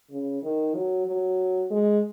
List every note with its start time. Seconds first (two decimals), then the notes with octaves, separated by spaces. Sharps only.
0.11 C#3
0.43 D#3
0.75 F#3
1.06 F#3
1.70 G#3